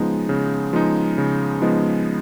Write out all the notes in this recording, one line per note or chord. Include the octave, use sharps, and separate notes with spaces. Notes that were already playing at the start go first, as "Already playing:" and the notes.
Already playing: C#3 F3 G#3 B3 D#4
C#3
F3 G#3 B3 D#4
C#3
F3 G#3 B3 D#4